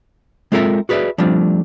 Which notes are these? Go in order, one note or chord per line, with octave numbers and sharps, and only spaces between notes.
G#3 C4 F4 A4 A#4 E5
F#4 G#4 B4 C#5 D5 E5
F3 G3 A3 C4 D4 F4